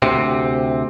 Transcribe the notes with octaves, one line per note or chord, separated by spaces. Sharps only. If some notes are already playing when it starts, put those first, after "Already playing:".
D2 C3 C4